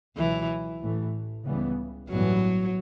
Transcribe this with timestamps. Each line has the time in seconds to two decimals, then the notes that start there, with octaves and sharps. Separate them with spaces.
0.17 C#2 B2 E3 F#3
0.81 A1 A2 E3 A3
1.45 C#2 C#3 E3 G3 B3
2.10 A1 G2 E3 F#3 B3